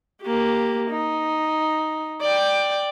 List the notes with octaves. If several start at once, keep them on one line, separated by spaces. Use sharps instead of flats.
A#3 G4
D#4
D5 G5